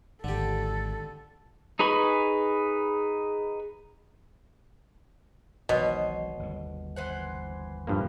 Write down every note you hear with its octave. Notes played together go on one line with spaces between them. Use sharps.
G#1 D3 G4 A4
D#4 G#4 B4 B5 C#6
E1 B1 B2 D#3 C5 C#5 D#5
G1 D#2 D3
E3 C5 F#5
G2 F3 A#3